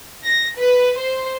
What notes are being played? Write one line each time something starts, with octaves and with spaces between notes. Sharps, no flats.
A#6
B4
C5